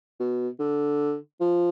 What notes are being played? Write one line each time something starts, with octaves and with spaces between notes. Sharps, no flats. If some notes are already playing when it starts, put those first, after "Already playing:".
B2
D3
F3